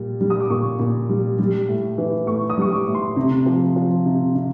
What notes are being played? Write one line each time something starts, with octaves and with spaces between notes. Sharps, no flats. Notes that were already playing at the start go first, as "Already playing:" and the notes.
Already playing: A#2 G3
G3
D#6
D6
A#2 C#6
A#2
G3
G3
A2
E3
A2 C#6
D#6
G3 C#6
D6
A2
C6
C3
F3
F3
C3
C3